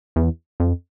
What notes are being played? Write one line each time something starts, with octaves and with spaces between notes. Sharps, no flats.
E2
F2